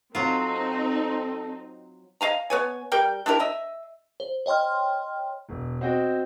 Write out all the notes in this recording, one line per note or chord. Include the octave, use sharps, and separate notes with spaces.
F#3 C4 D#4 F4 A4
D#5 F5 G#5 A#5
B3 C#5 G#5
G3 A#4 G5
D4 E4 G4 A#4
D#5 E5
C5
C#5 D#5 G5 C6 F6
E1
C4 F#4 D#5 G5